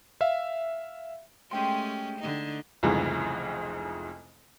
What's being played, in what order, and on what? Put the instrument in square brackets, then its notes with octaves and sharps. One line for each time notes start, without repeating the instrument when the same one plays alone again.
[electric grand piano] E5 F5
[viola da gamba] G#3 A3 C#4 [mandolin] G4 G5 C6
[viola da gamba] D3 D#4
[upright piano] F1 C2 F2 G#2 C#3 E3